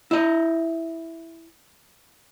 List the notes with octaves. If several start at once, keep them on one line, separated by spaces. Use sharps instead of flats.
E4 D#5